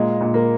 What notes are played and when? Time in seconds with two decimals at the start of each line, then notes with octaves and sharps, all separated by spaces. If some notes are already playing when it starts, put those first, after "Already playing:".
Already playing: A#2 G#3
0.21 A#2
0.34 A#3